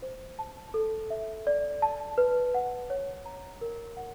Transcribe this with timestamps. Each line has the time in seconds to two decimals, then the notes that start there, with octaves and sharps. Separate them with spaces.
0.02 C5
0.39 A5
0.74 A4
1.10 E5
1.47 D5
1.82 A5
2.18 B4
2.54 F#5
2.90 C#5
3.26 A#5
3.61 A#4
3.97 F#5